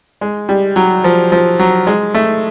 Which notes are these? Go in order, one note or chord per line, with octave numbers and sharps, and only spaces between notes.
G#3
G3
F#3
F3
F3
F#3
G#3
A3